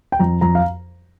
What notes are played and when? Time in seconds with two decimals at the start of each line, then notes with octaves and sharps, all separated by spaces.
0.12 G5
0.19 F2 A#5
0.41 F2 A#5
0.55 F5